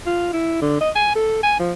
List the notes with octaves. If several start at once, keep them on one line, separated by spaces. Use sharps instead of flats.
F4
E4
D3
D#5
G#5
A4
G#5
F3